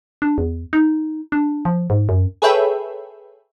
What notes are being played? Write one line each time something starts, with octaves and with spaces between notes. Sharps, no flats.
D4
E2
D#4
D4
F3
G#2
F#2
G#4 A4 B4 C#5 E5 G5